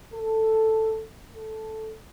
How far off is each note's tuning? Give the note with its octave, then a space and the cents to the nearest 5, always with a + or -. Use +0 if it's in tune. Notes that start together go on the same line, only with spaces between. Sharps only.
A4 +5
A4 -5